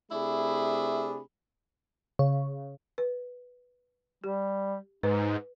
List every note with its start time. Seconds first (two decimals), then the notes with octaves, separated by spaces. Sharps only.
0.11 C3 A3 D4 E4 G#4 B5
2.19 C#3
2.98 B4
4.24 G3 G4
5.03 G#2 D#4 B4